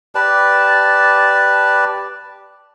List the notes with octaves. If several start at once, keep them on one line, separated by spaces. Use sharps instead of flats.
G4 B4 D5 A5